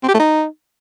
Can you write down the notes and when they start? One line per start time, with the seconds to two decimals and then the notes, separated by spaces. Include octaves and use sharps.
0.03 C4
0.09 G4
0.14 A3
0.20 D#4